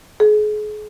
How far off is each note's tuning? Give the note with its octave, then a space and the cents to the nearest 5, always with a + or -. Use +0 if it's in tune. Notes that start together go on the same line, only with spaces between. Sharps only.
G#4 +35